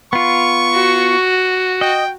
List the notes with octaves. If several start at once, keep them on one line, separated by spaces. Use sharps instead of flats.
B3 F4 C#6
F#4
D#5 G5